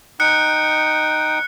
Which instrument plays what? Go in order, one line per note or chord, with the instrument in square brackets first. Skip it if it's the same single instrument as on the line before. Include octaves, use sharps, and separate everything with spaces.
[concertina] D#4 G5 D#6 [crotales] F#6 C#7